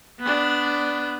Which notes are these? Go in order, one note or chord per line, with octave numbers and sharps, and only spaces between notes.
B3 D4